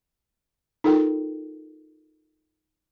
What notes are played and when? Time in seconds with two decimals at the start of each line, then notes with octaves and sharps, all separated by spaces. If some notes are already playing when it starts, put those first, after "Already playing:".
0.84 D#4 F4 A4 A#4 G5